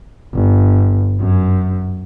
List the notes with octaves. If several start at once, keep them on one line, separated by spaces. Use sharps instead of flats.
G1
F#2